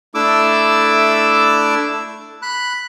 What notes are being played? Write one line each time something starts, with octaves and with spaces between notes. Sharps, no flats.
A3 D4 E4 D6 E6
B5 F#6